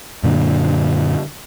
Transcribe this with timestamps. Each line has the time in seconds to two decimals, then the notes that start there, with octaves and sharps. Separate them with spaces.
0.23 F#2 A#2 D3